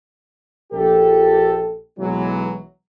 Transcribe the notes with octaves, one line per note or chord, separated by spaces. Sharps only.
A#1 G4 A4
B1 E3 F#3 G#3